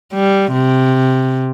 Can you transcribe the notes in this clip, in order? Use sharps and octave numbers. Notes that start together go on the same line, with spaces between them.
G3
C3